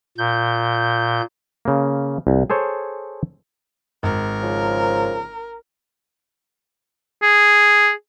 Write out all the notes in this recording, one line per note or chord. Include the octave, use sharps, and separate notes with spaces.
A#2 G6
C#3 A#3
C2
G#4 A4 C5 C#5
G#1 A#4
C#3 F3
G#4